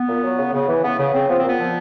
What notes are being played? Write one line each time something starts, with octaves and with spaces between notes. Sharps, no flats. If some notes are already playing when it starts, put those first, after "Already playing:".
Already playing: B3
A#2
F#3
C#3
C#3
E3
C#3 B3
C#3
C#3 C4
F3 B3
C4
A#2 B3
F3